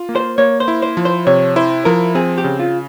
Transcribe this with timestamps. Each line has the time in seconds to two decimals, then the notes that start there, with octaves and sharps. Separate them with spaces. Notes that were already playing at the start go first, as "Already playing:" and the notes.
Already playing: F4
0.09 A#3
0.16 C5
0.38 A#3 C#5
0.60 C5
0.68 E4
0.82 C5
0.97 F3
1.05 C5
1.27 C3 C#5
1.56 E4 C5
1.85 F3 A#4
2.15 C4 G#4
2.38 G4
2.44 C#3
2.59 F4